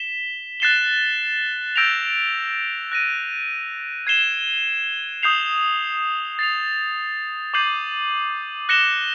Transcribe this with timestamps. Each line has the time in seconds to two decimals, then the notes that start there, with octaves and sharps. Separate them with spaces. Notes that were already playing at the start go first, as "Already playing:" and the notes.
Already playing: B6 E7 G7
0.60 F#6 A6 C7 E7 G7
1.76 E6 G6 A#6 D7 F7
2.92 F#6 A#6 D#7
4.07 G#6 C7 E7 G7
5.23 D#6 G6 C7 F7
6.39 A6 C7 F7
7.54 D6 G6 C7 D#7 F#7
8.69 F#6 A#6 C#7 E7 G7